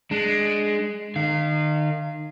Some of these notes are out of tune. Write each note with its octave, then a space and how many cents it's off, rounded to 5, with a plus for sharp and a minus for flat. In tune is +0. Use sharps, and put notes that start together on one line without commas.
G#3 +5 D4 +20
D#3 -35 F5 -20